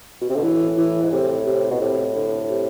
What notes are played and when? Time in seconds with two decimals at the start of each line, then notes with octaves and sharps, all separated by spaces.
0.21 B2
0.29 C3
0.36 B2 D3
0.43 A2 E3
0.77 E3
1.02 G#2
1.12 A2 C3
1.47 C3
1.71 B2
1.81 A2 C3
2.16 D3
2.50 C3